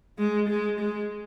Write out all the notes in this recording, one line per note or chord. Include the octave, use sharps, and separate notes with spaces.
G#3
G#3
G#3